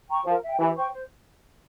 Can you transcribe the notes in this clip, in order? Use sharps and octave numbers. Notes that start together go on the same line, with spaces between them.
G5 A#5 C#6
F3 A#4
E5 G5
E3 G4
C5 G5 C#6
C5